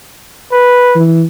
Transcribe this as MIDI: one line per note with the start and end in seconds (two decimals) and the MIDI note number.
0.52 1.01 71
0.96 1.24 52